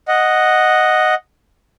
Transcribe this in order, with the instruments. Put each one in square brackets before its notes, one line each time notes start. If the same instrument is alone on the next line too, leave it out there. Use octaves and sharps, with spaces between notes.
[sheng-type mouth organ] D#5 F#5